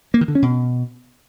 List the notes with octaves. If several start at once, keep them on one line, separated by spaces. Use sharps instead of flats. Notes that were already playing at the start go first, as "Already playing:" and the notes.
A#3
D#3
D3
C#4
B2